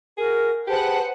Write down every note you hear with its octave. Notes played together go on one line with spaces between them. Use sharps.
F#4 G#4 A#4
G4 G#4 B4 C5 F#5 A5